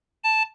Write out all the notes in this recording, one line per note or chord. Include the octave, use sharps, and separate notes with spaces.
A5